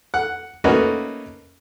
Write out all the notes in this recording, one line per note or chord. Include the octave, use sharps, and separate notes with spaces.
F#5
A3 A#3 C#4 D#4 F#4 B4